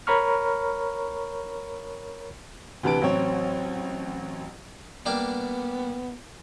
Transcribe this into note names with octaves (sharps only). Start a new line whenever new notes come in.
A#4 C#5 A#5 B5 C#6 F6
D2 C3 E3 B4 A5 D7
A1 F#3 C4 C#5
G3 A#3 B3 D4